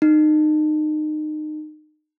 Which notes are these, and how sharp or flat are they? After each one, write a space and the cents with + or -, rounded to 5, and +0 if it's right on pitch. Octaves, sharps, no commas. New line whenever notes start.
D#4 -25